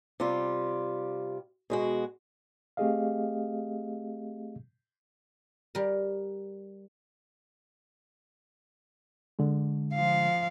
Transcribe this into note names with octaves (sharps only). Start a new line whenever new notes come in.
C3 G3 F4
B2 G#3 F#4
A3 C4 G4 G#4 D#5 F5
G3 A#4
D3 G#3
F3 F5